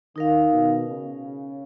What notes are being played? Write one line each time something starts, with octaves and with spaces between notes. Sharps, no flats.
D#3 D#4 A#4 F5
B2
C#3